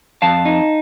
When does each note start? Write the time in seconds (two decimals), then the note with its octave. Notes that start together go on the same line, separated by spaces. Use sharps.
0.22 F2 F5 A5
0.45 D#4